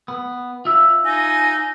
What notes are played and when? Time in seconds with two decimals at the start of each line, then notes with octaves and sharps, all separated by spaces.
0.08 B3
0.65 F4 E5
1.05 D#4 G#5